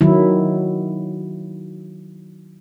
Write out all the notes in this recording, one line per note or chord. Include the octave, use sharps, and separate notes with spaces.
D#3 F#3 E4